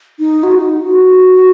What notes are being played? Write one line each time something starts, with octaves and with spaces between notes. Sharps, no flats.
D#4
F#4
D#4
F#4